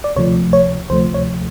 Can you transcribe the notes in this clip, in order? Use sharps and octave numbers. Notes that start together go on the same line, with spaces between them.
D5
D2 C3 F3 A3 C#5
C#5
D2 C3 F3 A3 C5
C#5